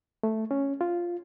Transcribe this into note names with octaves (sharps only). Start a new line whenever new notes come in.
A3
C#4
F4